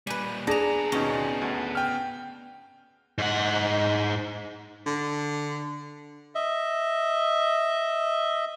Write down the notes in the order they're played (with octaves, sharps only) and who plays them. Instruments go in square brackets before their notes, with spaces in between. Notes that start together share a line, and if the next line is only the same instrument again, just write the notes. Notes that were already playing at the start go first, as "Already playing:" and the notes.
[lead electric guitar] A#2 G3 [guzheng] B4 G#5
[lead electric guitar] B3 A5 [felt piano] D4 G#4 A#6 [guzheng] D5 A#5
[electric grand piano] D#2 B2 D#4 [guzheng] C#4
[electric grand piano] D2
G5 F6
[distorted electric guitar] G#2 F#5
[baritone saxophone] D3
[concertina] D#5 E5